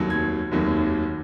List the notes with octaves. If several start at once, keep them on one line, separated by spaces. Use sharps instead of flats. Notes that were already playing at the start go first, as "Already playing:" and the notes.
Already playing: F1 D#2 D#3 F#3
G#6
F1 D#2 D#3 F#3